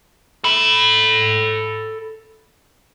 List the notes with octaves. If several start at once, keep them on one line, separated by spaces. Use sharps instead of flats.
A4 B5